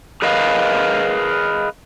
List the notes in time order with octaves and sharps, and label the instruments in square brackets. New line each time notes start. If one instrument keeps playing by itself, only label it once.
[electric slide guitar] G#4 A#4 B4 D#5 F5